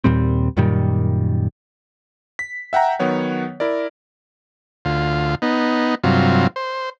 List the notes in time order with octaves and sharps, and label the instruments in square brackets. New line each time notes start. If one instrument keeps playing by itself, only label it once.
[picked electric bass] D#2 A#2 G3 C4
F#2 A#2 D#3 G3
[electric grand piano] B6
E5 F#5 G5 A#5
D#3 F#3 B3 C#5 F#5
E4 A#4 D5
[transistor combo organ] D2 F4
B3 D#4
G2 C3 F#3 F4
C5